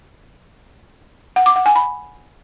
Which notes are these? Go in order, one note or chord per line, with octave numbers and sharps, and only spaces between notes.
F#5
D6
F#5
G#5
B5